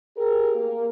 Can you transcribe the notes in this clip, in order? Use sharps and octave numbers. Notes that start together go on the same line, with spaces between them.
G4 G#4 A#4
A#3